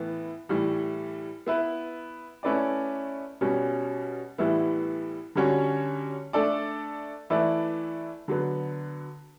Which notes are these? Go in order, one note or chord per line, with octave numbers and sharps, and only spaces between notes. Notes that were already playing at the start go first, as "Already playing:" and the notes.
Already playing: A2 E3 B3
A2 E3 G3
B3 E4 B4
A3 C#4 E4 B4 D5
B2 G3 C#4
A2 E3 G3 B3 E4
D3 G3 C#4 F#4 C#5
A3 D4 A4 D5
E3 A3 E4 B4 D5
D3 F#3 B3